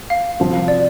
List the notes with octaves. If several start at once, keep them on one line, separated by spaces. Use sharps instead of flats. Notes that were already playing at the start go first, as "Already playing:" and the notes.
F5
C3 F3 C4
D5